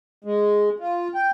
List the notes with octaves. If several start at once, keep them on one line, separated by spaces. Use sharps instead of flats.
G#3
F4
G5